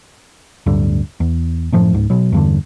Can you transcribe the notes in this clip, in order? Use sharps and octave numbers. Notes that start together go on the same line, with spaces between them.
D1 D2 G2 D3
E2
F#2 A2 F3
C#2 G#2
B2 F#3
E2 G2 D3